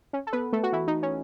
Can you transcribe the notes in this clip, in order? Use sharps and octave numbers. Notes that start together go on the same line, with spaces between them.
C#4
A4
B3 B4
A3 A4
F#4
E3 E4
D#4
C#4